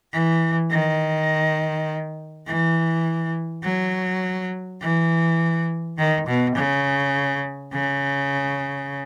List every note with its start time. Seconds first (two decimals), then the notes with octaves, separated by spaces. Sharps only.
0.13 E3
0.71 D#3
2.47 E3
3.63 F#3
4.81 E3
5.98 D#3
6.27 B2
6.56 C#3
7.73 C#3